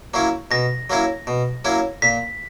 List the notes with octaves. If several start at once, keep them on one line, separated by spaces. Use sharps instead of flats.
F#3 A#3 C#4 E4
B2 A#6
F#3 A#3 C#4 E4
B2
F#3 A#3 C#4 E4
A#2 B6